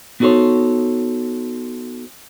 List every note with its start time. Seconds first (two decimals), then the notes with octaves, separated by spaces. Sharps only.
0.20 B3 D#4 F#4 A4 C5 C#5